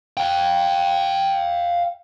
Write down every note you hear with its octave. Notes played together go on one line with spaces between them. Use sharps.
F5 G5